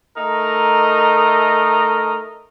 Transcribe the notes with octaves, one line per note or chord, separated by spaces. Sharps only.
A3 D#4 A#4 D#5